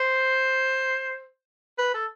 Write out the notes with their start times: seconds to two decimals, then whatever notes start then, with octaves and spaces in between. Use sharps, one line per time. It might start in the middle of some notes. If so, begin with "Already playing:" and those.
Already playing: C5
1.78 B4
1.94 A4